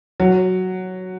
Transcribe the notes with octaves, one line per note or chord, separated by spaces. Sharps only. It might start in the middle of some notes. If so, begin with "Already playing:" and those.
F#3